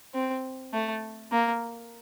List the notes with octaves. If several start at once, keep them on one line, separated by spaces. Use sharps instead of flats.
C4
A3
A#3